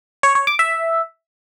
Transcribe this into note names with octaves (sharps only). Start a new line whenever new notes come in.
C#5
C#5
D6
E5